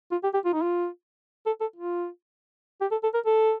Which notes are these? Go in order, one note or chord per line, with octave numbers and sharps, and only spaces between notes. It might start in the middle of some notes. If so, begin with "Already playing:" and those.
F4
G4
G4
F4
D#4
F4
A4
A4
F4
G4
A4
A4
A#4
A4